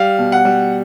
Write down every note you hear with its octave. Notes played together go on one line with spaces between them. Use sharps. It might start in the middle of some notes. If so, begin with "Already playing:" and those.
Already playing: G3 F5
B2
F#5
G3